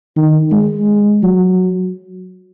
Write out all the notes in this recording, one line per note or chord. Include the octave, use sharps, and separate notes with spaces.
D#3
G#3
F#3